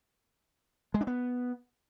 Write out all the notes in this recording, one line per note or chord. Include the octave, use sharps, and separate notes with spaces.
G#3
D4
B3